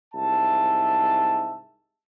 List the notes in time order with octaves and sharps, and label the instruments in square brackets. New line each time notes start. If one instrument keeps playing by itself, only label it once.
[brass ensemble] C2 G#2 E5 A5